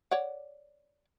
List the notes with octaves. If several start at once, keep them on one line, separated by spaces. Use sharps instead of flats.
C#5 D5 F#5